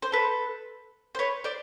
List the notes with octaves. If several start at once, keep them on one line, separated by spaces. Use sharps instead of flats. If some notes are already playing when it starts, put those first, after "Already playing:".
C5
A4 B4
C5
B4 C#5
C5 D5